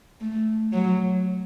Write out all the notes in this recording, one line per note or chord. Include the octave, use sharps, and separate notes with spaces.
A3
F#3